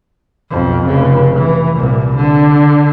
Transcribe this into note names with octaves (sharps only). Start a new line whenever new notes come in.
B1 F2
F1 C#3
E3
C2 A#2
D3